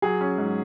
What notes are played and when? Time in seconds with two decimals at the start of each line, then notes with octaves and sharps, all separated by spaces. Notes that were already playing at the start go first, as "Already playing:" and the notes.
0.02 F#3 G#4
0.21 C#4
0.38 G#2